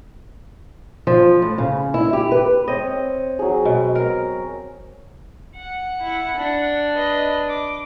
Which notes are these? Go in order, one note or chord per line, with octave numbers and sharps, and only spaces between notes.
F3
A2
C#3
E4
G4
B4
C4 C5 C#5 D#5
F#3 G#4
B2
A#4
F#5
E4
D4
B4 D#5
D6